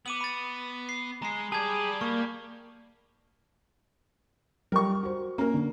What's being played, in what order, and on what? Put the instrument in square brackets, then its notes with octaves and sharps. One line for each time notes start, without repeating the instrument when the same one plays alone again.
[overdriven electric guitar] B3 [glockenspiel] D6 D#7 F#7
[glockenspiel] B5 A6
C7
[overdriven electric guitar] G#3 [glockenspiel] A#5 C7
[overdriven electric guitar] G3 D5 [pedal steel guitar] G#4 [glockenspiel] A5 G#6
[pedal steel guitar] A#3 [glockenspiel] C#6
[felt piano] G3 [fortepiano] A#4 C#6
[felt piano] F#4 C5
[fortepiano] A#3 A#4 [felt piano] C#4
[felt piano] D3